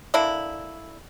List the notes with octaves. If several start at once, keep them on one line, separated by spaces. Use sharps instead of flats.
D3 A#3 D4 E4